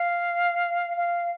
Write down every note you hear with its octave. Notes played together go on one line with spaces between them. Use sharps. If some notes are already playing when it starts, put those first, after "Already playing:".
Already playing: F5
F5